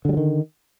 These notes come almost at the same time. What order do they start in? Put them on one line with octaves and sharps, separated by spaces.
D3 G3 F#3 D#3